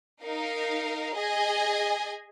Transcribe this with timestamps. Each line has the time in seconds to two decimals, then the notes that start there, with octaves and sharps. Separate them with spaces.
0.23 D#4 A#4 F5
1.15 G#4 D#5 G#5